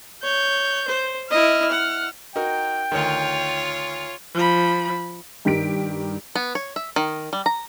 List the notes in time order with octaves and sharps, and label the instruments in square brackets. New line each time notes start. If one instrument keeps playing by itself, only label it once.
[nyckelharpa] C#5 [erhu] G6
[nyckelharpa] C5
[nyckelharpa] E4 D#5 [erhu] F6
[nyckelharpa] F#5
[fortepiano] D#4 F#4 A#4 [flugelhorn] G5
[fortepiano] D2 D#3 [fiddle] F4 C#5
[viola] F3 B5
[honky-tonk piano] G2 D#3 G4 B6 D7
[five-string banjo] B3
C#5
E5
D#3
G3
A#5